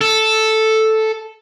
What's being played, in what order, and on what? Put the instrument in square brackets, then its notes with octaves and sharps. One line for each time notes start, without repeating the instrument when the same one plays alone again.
[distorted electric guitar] A4